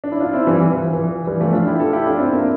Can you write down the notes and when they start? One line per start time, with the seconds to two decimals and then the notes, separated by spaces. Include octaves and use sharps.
0.04 D4
0.12 E4
0.20 D4 F4
0.33 C4 E4
0.47 E3 G3
0.60 E3
0.74 E3
0.83 F3
0.93 E3
1.27 E3 G3
1.40 F3 A3
1.53 D4 F4
1.67 E4 G4
1.80 F4 A4
1.93 E4 G4
2.06 D4 F4
2.20 C4 E4
2.33 A#3 D4